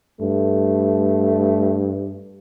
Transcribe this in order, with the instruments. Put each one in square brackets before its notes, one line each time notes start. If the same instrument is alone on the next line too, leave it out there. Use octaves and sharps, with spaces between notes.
[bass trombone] G2 [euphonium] A3